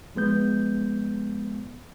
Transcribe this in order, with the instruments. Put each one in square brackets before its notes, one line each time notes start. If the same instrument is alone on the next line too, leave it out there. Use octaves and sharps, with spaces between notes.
[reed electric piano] F3 G#3 B3 G6